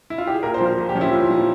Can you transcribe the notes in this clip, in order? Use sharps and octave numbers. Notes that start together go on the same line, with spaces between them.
E4
F4
G4
G#4
A#2 A#4
C5
F3 A#4
A#2
G4
F3 C#4
E4
A#2
F3